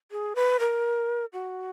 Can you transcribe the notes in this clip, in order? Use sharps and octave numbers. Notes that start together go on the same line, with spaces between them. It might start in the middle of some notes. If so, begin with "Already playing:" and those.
G#4
B4
A#4
F#4